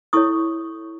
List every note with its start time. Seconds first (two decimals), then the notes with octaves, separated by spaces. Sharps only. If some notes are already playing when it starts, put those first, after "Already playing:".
0.13 E4 A4 C#5 C#6 D#6